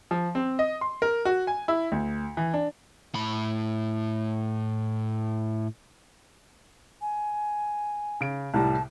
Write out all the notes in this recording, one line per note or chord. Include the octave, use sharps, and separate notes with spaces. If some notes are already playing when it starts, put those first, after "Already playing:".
F3
C4
D#5
C6
A#4
F#4
G#5
E4
D2
E3
D4
A2 B5
G#5
C#3 D7
C2 A2 G3 A5